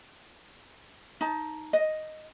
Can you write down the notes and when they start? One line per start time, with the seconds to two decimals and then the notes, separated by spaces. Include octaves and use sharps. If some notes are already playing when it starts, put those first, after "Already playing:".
1.21 D#4 A5
1.73 D#5